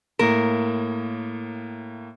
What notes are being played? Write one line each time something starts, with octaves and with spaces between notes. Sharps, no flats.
A2 A#3 A#4 E7